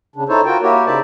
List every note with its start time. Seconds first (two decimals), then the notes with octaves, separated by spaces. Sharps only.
0.16 C#3 D4
0.29 D#4 E4 A4 C5 C#5
0.46 F4 F#4 A#4 G5
0.62 A#3 E4 F#4 G4 A#4 C#5
0.86 C#3 D#4 C5 D5 E5 A5